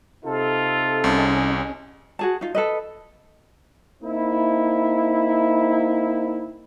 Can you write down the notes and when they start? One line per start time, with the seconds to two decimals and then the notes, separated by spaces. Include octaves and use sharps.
0.24 C3 D#4 F4 A4
1.04 C2 C#4 G#4 D#5
2.19 F#4 G#4 A5
2.41 D#4 F4
2.55 A4 B4 D#5
4.03 A#3 C4 D#4 E4